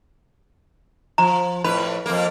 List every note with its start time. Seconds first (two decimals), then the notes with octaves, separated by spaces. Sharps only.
1.18 F3 A#5
1.64 F2 A2 B4 B5
2.06 F2 A#3